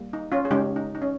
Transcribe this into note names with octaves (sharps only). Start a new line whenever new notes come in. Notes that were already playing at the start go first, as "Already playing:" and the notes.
Already playing: G3 A#3
D#4
C#4 F4
G#4
C#3 G#3 C#4 D#4 G4
D#4
D#4
C#4